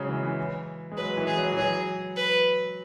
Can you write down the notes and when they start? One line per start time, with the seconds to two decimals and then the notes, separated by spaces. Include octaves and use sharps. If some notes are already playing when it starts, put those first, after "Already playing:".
Already playing: C#3 F#3 G#3
0.08 E3
0.23 E3
0.92 G#3
0.97 F#3 B4
1.17 E3
1.27 G#4
1.37 F#3
1.52 E3
1.57 F#3 G#4
2.16 B4